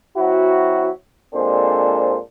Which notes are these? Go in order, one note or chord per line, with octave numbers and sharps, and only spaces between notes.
F#3 C4 E4 F#4
A#2 G#3 C4 D4 A4 C5